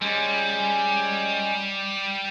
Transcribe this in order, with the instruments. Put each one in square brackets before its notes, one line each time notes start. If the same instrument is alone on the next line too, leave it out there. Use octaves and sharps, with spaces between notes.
[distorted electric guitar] G3 [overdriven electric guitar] G#3 C#4